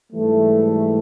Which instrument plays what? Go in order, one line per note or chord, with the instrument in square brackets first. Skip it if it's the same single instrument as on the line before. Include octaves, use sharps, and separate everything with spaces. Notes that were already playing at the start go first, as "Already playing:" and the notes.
[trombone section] G#2 E3 G3 A3